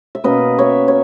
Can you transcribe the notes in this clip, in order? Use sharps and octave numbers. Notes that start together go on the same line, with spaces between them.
E5
B2 A#3 C#4 B4 D#5
C#5 E5
C#5